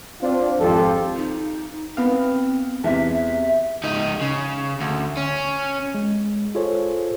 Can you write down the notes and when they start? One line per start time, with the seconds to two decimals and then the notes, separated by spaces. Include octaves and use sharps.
0.22 C4 D4 F4
0.60 G#1 F2 C4 F4 G4 A4
1.16 D#4
1.97 B3 C4 F5
2.84 E2 C3 E5
3.84 C#2 D#4
4.22 C#3
4.81 D2
5.17 C#4
5.95 G#3
6.55 F4 G#4 A4 C5 C#5